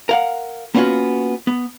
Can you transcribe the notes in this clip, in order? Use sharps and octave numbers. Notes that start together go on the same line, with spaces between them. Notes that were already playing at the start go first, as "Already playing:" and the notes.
A#4 F5 F#5
A#3 B3 C#4 D4 F4 F#4
B3